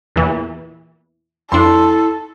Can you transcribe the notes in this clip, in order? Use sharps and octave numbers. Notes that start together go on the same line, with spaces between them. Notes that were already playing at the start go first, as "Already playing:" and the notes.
E2 A#2 E3
F2 D4 E4 A4 C6